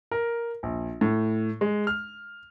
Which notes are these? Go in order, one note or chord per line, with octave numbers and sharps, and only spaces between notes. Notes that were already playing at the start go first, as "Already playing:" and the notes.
A#4
A#1
A2
G#3
F6